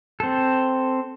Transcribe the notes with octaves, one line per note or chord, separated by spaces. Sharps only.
C4 A4